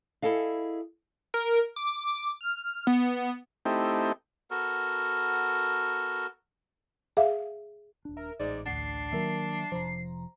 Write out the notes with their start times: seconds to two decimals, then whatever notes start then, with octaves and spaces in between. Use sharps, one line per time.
0.22 E4 G#4 A4 D#5 F5
1.34 A#4
1.76 D6
2.41 F6
2.87 B3
3.65 A3 C4 D#4 E4 G4
4.51 B3 F#4 A4 A#4
7.17 G#4 E5 F5
8.05 D#1 D4
8.17 A#4 E5
8.40 A1 G#2 D5
8.66 D2 A2 D4 F#5 C7
9.12 D#3 F#3 A#3 A#4 E5
9.72 F1 C3 F3 C5 A#5